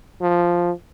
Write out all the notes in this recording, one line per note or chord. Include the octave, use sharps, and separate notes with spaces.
F3